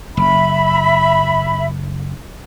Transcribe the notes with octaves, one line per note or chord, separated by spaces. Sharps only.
F#1 E5 B5